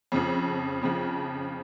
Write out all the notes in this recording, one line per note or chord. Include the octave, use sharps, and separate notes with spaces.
F2 C#3 F3
F2 C#3 F3